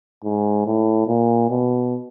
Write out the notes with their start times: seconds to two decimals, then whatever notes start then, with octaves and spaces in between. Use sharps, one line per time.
0.24 G#2
0.66 A2
1.07 A#2
1.50 B2